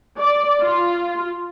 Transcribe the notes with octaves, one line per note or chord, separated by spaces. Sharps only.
D5
F4